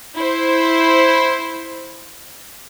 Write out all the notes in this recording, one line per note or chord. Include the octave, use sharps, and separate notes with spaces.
E4 C5